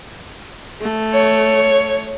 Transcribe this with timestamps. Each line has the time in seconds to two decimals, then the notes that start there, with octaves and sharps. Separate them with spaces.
0.81 A3
1.14 C#5